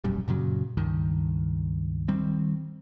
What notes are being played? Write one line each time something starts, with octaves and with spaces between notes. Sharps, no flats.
E1 A#1 F#2 G3
F#2 A#2 C#3 F#3
C#2 G2 D#3
D#3 G3 C4